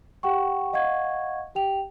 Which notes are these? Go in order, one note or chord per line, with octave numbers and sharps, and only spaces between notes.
G4 F#5 G5 C#6
D#5 F5 F#5 C#6 G#6
G4 G5 F7